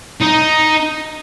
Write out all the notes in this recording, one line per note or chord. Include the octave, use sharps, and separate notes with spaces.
D#4